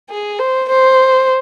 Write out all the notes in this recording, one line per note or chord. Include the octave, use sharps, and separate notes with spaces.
G#4
C5
C5